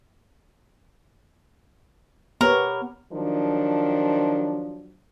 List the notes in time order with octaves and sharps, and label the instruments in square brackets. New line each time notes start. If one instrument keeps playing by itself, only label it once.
[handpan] B3 G4 C#5 [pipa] A#4
[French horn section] D#3 F3 F#3 D4